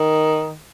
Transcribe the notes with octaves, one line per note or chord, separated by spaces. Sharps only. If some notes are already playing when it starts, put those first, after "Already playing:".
Already playing: D#3